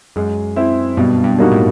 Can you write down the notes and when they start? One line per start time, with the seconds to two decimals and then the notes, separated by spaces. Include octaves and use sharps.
0.16 F#2 G#3
0.56 C4 E4
0.97 G2 B2
1.24 G2
1.39 G3 A#3 D#4 F#4
1.51 A2